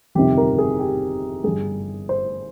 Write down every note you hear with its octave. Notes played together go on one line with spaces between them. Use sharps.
G1 F2 C3 D#3 G4
A#4
G#4
G4
G1 G2 G3 G#4
C5